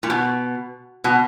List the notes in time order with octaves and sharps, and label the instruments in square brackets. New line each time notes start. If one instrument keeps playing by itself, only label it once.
[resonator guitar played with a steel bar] A#2
B2
B2